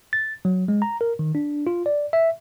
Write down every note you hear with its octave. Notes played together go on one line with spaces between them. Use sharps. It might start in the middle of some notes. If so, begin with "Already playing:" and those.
A6
F#3
G#3
A#5
A#4
D#3
D4
F4
D5
E5